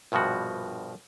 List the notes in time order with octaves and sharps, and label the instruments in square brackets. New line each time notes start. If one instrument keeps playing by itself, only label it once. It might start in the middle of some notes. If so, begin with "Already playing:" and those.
[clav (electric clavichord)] A#1 G2 B2 F3 F#4